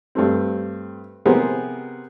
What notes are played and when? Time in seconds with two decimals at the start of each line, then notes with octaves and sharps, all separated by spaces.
0.15 G2 A3 C4
1.25 C3 B3 G4 G#4 A#4 C5